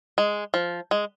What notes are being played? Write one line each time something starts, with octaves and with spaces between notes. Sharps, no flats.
G#3
F3
G#3